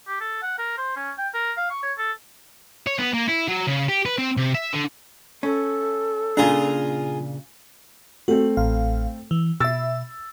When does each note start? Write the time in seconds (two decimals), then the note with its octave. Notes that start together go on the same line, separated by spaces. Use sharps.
0.07 G4
0.21 A4
0.43 F#5
0.58 A#4
0.78 C5
0.97 C#4
1.18 G5
1.34 A#4
1.57 F5
1.71 C#6
1.83 C#5
1.98 A4
2.87 C#5
2.99 B3
3.14 A#3
3.28 E4
3.48 F#3
3.67 C#3
3.88 G4
4.06 B4
4.18 C4
4.37 C3
4.55 E5
4.73 D3
5.43 C#4 A4
6.37 A#2 C#3 D4 F4 G#4 A#5
8.28 A3 C4 F#4 A4
8.57 A1 F5
9.31 E3
9.60 B2 E5 E6 A6